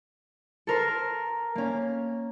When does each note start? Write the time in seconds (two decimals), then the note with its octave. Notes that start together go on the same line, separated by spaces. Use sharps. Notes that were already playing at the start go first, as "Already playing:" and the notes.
0.67 A4 A#4 C5
1.55 A#3 C#4